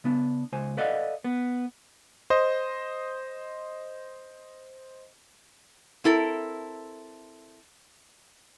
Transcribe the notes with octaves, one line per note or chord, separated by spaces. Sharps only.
C#3 B3 D4
C#2 C5 G#5
A4 B4 D5 D#5 F5 F#5
B3
C5 D#5
C4 E4 A4 A#4